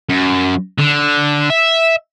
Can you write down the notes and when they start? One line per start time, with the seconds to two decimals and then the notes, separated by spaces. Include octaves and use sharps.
0.09 F#2
0.79 D3
1.50 E5